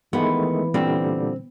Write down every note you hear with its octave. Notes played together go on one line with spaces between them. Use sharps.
D#3 E3 G#3 A3 B3
A#2 D3 G3 C4